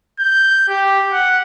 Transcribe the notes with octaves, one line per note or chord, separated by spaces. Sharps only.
G6
G4
F#5